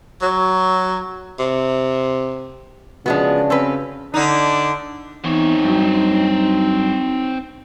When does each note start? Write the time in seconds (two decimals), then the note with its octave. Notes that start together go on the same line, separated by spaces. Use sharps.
0.22 F#3
1.39 C3
3.06 C#3 F3 G#3 B3 D4 F#4
3.50 C4 C#4 B4
4.14 D3 D4 D#4
5.25 E2 C4 D#4 C#5
5.65 G2 F#3